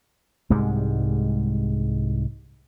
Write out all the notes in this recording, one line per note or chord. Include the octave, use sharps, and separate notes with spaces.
C2 G#2 G3 G#3